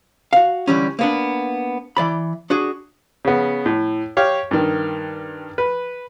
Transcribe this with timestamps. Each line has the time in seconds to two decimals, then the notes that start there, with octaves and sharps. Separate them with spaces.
0.33 F#4 F5
0.67 D3 E3 G3 C#4
0.99 A#3 B3 D4
1.97 E3 D5 B5
2.50 D4 F#4 G#4
3.25 C#3 B3
3.66 A2
4.17 G4 C#5 F5
4.51 G2 D#3
5.58 B4